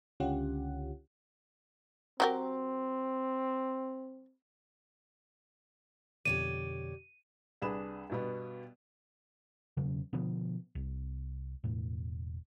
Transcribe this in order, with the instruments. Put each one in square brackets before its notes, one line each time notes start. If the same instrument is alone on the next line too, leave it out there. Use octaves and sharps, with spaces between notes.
[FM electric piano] C#2 D3 C#4 F4 G4 F#5
[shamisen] F#3 G4 A#4 [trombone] C4
[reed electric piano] F2 B2 D3 [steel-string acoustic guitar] G4 C#5 D5 [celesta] D#7
[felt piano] C2 D4 G#4 B4 B5 E7
G2 B2 B3
[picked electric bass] E1 C#3 F#3 C#4
B2 D3 F3 B3
C2
E1 A2